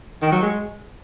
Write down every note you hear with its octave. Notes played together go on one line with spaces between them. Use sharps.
D#3
F#3
G#3